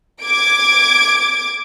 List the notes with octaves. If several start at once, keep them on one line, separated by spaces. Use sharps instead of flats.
D6 G#6 D7